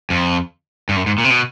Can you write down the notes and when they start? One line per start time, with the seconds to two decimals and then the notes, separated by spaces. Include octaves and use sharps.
0.10 F2
0.89 G2
0.96 F#2
1.06 G#2
1.18 A#2
1.24 C3
1.30 B2